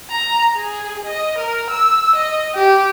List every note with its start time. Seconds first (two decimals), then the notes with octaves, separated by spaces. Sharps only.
0.10 A#5
0.55 G#4
1.05 D#5
1.38 A#4
1.70 E6
2.16 D#5
2.55 G4